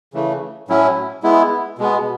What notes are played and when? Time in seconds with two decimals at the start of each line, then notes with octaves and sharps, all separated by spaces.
0.13 C#3 E3 A3
0.68 A2 F#3 C#4 E4
1.23 G#3 B3 E4
1.78 B2 G#3 B3